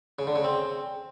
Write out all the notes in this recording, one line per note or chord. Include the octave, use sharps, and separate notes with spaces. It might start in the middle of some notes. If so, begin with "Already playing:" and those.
C#3
D3
C#3
C4